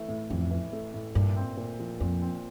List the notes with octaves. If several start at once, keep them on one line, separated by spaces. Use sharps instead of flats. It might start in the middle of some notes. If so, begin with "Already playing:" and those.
Already playing: E3 A3
A2
A1 F2
E3
A3
A2
G2 A#2
C4
A#2
F3
F2 A#2
C4